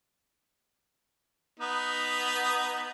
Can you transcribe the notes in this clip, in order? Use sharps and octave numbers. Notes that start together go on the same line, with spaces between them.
B3 D#4